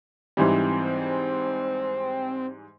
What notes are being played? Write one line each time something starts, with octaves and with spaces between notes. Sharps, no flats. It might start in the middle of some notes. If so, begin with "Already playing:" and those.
G#2 E3 G3 C4